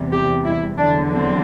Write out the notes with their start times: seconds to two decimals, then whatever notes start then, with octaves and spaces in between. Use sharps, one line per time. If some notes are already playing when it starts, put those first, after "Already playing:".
Already playing: E2 C3 E3 G3
0.12 G4
0.45 E4
0.78 E2 D3 F#3 D4
1.13 C4